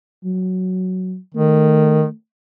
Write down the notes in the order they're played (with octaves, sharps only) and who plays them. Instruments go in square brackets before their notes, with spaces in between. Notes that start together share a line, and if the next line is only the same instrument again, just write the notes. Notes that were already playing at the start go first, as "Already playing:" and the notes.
[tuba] F#3
[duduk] D#3 [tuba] A3